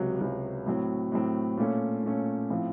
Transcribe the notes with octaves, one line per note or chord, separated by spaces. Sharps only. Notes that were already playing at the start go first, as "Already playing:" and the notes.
Already playing: C#2 C3 F#3
C#2 C3 F#3
A2 F#3 C4
A2 F#3 C4
A#2 A3 C#4
A#2 A3 C#4
A2 F3 C4